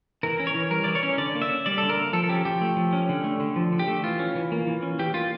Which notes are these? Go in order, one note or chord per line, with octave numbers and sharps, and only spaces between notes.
E3 A#4
C#4
C#5
E3
G3 A#4
E3 D5
C#5
C#4
D3 D5
A#3
E5
C#4
G3 D5
D3 A4
A#4
A#3
F3 A4
A4
C#4 G4
F3 G4
A3
F3
C#4
D3
A3
D3
F3
D3
G4
A3
E3 F4
C#4
E3
A#3
E3
C#4
E3 G4
A#3 F4